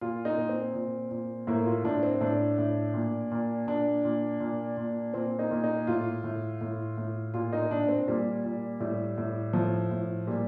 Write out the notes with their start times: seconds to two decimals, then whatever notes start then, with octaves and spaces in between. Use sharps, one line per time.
0.01 A#2 F4
0.25 D#4
0.37 A#2
0.49 C4
0.75 A#2
1.11 A#2
1.47 A2 A#3
1.66 F4
1.84 A2 D4
2.03 C4
2.21 A2 D4
2.58 A2
2.94 A#2
3.31 A#2
3.67 A#2 D4
4.05 A#2
4.40 A#2
4.77 A#2
5.14 A#2 C4
5.39 D#4
5.51 A#2
5.64 D#4
5.87 A2 F4
6.24 A2
6.61 A2
6.98 A2
7.34 A#2 F4
7.53 D#4
7.71 A#2 D4
7.88 C4
8.08 A#2 G3
8.44 A#2
8.80 A2 G3
9.18 A2
9.53 A2 F3
9.91 A2
10.27 A#2 G3